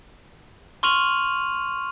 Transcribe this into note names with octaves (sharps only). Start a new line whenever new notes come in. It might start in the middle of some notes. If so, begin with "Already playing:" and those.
C6 C#6 F6 D#7 F7 F#7